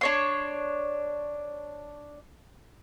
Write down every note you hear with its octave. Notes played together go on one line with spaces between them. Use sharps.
D4 C#5 C6